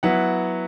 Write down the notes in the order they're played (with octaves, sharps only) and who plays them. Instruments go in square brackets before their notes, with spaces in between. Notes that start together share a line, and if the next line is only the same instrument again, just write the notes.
[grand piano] F#3 B3 E4 F#5